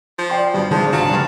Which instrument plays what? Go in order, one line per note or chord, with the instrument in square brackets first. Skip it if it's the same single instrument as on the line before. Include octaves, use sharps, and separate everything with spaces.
[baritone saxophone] F3
[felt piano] D5 G5 C6
[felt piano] G2 [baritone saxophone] B2
[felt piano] G#1 G#4 [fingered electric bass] D3 D#3 G#3 [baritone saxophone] F3 [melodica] D4
[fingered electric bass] C2 G2 D3 [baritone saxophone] F#3 [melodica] F5 A5
[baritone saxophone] G2 [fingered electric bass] C#3 F3 A3